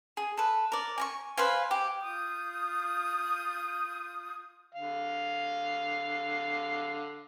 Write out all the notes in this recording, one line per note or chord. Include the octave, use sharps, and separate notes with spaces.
G#4
A4 B4
A#4 D5
G#5 A#5 C#6
B4 C5 F5 G#5
G4
F4 D#6 G6
D3 F5